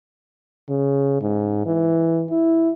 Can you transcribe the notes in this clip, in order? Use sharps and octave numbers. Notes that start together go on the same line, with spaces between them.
C#3
G#2
E3
E4